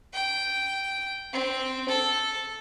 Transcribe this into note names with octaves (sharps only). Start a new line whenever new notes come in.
G5
C4
A4